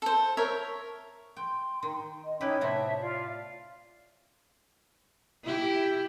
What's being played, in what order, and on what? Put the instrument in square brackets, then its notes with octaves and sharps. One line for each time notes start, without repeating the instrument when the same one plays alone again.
[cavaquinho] A4 C5
A#4 C#5 E5
[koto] G5 [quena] C6
[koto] D#3
[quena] D#5
[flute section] C#4 D#4 [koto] E4 G4 B4 [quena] C#5
[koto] A2 C3 B3 [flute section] E5 A5
[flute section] F4 D5 F5
[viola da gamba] E4 G4